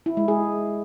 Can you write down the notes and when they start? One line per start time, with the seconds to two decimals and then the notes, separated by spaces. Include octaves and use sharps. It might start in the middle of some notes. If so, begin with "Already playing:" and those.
0.06 E4
0.17 G#3
0.28 G#4